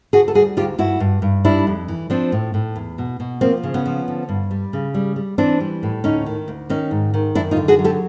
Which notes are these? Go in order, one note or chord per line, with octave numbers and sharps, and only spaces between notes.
D2 F#4 G#4
A4
G3 F#4 G#4
D2 F4 G4
G2 E4 F#4
G2
G2
G3 D4 E4
F2
E3
F3 C4 D4
A2
A2
E2
B2
B2
F3 A#3 C4
C#3
B3 C#4
F3
D3
G2
G3
C#3
G3
G3
E3 C4 D4
G3
A2
D2 C#4 D#4
D#3
D2
D#3 C#4 D#4
G#2
D#3
F#2 D4 E4
D#4 F4
D3
F#4 G#4
F#3
G4 A4